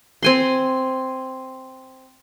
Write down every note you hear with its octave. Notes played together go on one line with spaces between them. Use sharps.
C4 G#5 C6